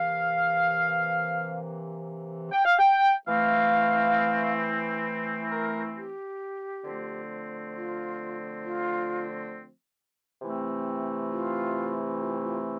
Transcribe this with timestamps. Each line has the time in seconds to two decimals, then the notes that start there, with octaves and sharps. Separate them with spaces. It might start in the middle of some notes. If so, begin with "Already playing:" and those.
Already playing: C3 E3 A#3 F5
2.52 G5
2.65 F5
2.79 G5
3.27 E3 A3 C4 F5
5.50 A#4
5.95 G4
6.84 D3 F3 A3 C4
7.74 F4
8.63 F4
10.41 C3 E3 A3 C4
11.31 F4
12.20 F4
12.43 F4